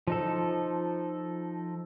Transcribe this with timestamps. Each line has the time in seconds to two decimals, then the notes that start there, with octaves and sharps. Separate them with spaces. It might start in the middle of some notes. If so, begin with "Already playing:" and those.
0.07 F3 D#4 A4